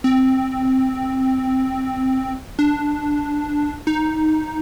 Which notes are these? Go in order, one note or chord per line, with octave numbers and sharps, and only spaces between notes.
C4
D4
D#4